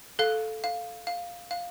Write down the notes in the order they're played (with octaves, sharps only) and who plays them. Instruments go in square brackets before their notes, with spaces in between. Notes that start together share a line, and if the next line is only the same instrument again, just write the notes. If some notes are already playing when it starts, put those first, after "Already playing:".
[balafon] A4 [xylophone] F5
[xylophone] F5
F5
F5